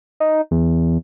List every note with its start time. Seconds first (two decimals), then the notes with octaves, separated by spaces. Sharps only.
0.20 D#4
0.51 E2